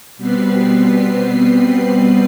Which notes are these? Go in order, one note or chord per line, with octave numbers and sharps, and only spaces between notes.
B2 G3 B3 C4 B4 C7